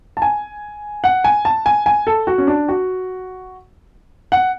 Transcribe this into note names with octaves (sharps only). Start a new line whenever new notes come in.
A5
G#5
F#5
G#5
A5
G#5
G#5
A4
F#4
C#4
D4
F#4
F#5